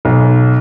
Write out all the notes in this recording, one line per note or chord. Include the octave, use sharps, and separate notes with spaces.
B1